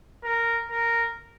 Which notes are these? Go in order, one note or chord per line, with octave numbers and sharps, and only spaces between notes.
A#4
A#4